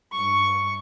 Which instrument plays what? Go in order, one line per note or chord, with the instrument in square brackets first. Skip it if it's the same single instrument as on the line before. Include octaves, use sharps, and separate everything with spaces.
[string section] G2 C#6